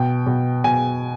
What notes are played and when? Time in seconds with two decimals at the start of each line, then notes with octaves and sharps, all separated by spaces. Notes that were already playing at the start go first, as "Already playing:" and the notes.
Already playing: B2 G5
0.27 B2
0.64 B2 G#5